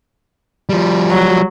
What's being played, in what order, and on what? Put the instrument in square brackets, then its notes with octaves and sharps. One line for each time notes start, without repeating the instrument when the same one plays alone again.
[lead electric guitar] F3 G3
[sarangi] F#3